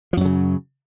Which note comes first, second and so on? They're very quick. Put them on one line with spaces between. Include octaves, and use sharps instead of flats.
F3 F#2 F#3 C#3